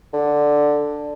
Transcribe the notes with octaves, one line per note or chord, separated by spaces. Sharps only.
D3